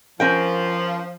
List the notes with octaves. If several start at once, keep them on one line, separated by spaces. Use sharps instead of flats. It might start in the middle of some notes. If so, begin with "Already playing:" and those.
F3 C#4 A#4 G5